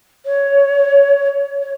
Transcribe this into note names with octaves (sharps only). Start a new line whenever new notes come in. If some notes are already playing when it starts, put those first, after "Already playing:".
C#5
C#5